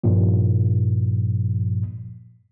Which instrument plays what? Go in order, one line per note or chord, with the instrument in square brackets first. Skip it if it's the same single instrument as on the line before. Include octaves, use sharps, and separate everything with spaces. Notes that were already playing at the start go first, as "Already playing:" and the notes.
[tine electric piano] G2 A#2 F3